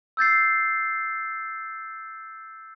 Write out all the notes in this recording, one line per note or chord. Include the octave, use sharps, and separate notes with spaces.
E6 G6 A6 C7